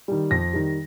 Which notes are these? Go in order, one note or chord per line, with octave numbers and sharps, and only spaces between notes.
D#3 G3
F2 A#6
D#3 G3